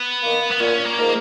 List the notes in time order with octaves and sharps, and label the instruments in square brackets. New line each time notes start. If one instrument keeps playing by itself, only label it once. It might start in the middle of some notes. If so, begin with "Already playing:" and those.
Already playing: [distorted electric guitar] B3
[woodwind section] D#3 A#3
[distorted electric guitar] B3
[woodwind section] A#2 [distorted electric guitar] C#4
[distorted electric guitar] A#3
[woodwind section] F3 G#3 D#4 A#4